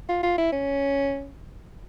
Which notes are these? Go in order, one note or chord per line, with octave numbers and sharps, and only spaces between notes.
F4
F4
E4
C#4